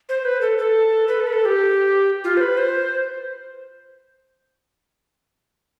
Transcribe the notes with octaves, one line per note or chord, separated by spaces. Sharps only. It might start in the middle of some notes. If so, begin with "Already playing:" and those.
C5
B4
A4
A4
B4
A4
B4
A4
G4
F4
C5
B4
C5